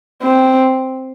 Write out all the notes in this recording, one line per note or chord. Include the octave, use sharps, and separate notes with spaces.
C4